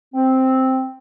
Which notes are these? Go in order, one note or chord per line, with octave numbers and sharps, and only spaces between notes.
C4